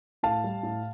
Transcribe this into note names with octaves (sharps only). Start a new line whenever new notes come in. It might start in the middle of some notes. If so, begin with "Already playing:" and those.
A2 F5 A5
G3
A2